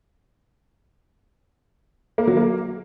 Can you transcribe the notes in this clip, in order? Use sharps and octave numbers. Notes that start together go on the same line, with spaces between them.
A#3
F#3
A#3